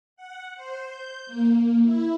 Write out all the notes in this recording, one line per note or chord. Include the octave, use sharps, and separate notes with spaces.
F#5
C5
G6
A#3
E4